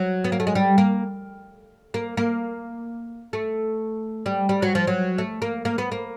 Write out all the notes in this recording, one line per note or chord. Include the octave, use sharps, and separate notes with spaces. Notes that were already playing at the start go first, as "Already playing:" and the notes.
Already playing: F#3
B3
A#3
A3
G#3
G3
A#3
A#3
A#3
A3
G3
G3
F#3
F3
F#3
A3
A#3
A#3
B3
A#3